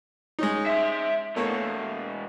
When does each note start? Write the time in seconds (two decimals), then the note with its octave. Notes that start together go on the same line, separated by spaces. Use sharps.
0.39 G#3 C#4 D#4
0.66 E5 C6
1.36 E2 B2 A3 A#3 C#5